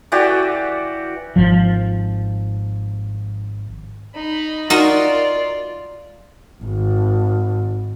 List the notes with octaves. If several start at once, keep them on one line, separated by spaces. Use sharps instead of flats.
E3 F#4 G4 D5
G#1 F3
D#4 B5
D#4 F4 F#4 A#4 D5
G#1